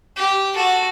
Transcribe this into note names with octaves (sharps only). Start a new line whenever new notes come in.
G4
F#4 A4